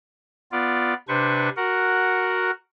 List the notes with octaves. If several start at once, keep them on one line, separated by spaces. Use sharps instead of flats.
B3 F4 D5
C3 D4 B4 C5 C#6
F#4 A#4 F#5